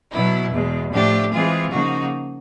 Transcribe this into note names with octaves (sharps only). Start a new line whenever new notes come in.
B2 F#3 B3 E4
E2 B2 G#3
A2 F3 A3 D4 G4
E3 G#3 C4 F4 G#4
C#3 F3 A#3 D#4 F#4